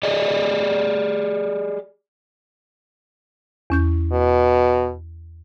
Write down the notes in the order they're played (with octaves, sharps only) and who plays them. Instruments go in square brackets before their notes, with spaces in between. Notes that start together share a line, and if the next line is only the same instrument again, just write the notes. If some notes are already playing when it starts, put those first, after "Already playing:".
[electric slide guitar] G4 G#4 D5 D#5
[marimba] E2 C#4 G6
[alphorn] B2